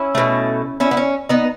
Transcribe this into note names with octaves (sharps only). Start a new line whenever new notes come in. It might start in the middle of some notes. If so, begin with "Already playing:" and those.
Already playing: C#4 E4
B2 A3
C#4 E4
B3
C#4
B3 D#4